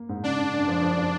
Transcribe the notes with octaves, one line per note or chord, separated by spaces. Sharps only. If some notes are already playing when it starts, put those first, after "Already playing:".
Already playing: A#3
G#2
C#3 D4
C#3
F#2
F3
F3
F3